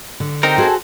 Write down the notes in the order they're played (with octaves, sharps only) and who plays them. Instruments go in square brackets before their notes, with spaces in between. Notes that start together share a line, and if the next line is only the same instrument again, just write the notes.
[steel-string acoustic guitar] D3
[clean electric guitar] C4 D#4 A#4 [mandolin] G4 G5
[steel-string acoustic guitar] F#4 C5 [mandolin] G#4 A4 A5